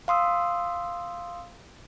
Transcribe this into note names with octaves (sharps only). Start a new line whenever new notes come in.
F5 C6 D#6 E6